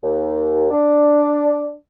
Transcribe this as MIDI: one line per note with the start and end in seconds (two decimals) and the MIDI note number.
0.02 0.67 39
0.71 1.74 62